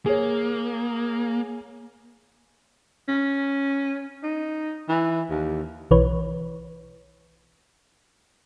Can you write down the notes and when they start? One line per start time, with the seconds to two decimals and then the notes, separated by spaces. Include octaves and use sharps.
0.06 A#3 G#4 C#5
3.08 C#4
4.23 D#4
4.88 E3
5.30 D#2
5.91 B1 E3 B4 C#5